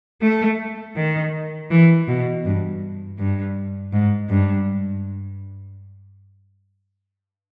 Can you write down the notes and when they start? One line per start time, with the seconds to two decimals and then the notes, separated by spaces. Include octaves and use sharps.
0.22 A3
0.96 D#3
1.70 E3
2.08 B2
2.45 G2
3.18 G2
3.93 G#2
4.29 G2